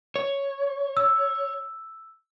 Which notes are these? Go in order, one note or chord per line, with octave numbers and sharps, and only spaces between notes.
C#5
E6